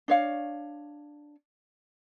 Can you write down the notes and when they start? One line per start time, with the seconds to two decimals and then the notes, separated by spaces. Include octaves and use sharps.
0.08 D4 C#5 F5